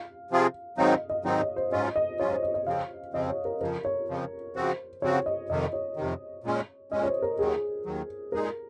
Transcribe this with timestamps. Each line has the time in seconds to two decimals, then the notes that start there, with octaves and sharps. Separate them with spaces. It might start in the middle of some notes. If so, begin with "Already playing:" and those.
Already playing: F5
0.31 C3 F3 C4 F4 G#4
0.78 G#2 D#3 F#3 C4 D#4 F5
0.93 D#5
1.10 D#5
1.25 G#2 D#3 F#3 C4 D#4 C#5
1.41 D#5
1.56 C5
1.72 G#2 F#3 C#4 F4 D#5
1.96 D#5
2.19 G#2 F#3 C#4 F4 C#5
2.31 C5
2.43 D#5
2.54 D#5
2.67 F2 C#3 F3 C4 F5
3.13 F2 C#3 F3 C4 D#5
3.29 C#5
3.45 A#4
3.61 F2 C#3 F3 A#4
3.85 C#5
4.08 F2 C#3 F3
4.55 C#3 F3 C4 F#4 C5
5.02 C#3 F3 C4 F#4 C#5
5.26 D#5
5.50 F2 C3 D#3 D#5
5.73 C#5
5.97 F2 C3 D#3
6.44 A#2 G#3 C#4
6.92 A#2 G#3 C#4 D#5
7.03 C#5
7.07 C5
7.22 A#4
7.38 D#2 D#3 F#3 G#4
7.86 D#2 D#3 F#3
8.32 A#2 G#3 D#4 G#4 A#4